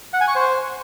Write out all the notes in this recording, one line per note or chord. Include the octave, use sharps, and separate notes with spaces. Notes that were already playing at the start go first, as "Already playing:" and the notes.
F#5
G#5
C#6
C5